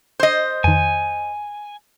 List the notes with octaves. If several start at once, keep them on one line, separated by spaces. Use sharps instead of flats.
C5 D#5
F2 D#3 G#5